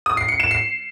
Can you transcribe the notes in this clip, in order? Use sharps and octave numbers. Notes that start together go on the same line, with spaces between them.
D#6
C7
C#7
E7
C7